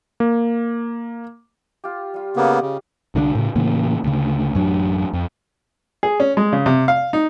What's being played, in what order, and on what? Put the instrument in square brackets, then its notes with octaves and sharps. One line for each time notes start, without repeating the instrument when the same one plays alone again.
[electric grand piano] A#3
[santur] F4 G4
G3 F4
[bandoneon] C#3 A#3 B3 [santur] G4 D5 D#5
[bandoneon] C#3
[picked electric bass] C2 D3 G3 D4
A2 C#3
A2 C#3 E3 A#3
D2 C#3
A1 F#2 F#3 D4
F2
[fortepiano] G#4
C#4
G#3
C#3
C3
F5
D#4